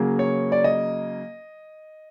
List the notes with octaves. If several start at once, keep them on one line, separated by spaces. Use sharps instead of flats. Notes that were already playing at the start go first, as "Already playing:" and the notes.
Already playing: C#3 F#3 A#3
C#5
D5
D#5